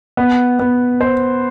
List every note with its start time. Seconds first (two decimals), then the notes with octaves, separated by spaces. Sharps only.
0.17 B3
0.59 B3
1.01 C5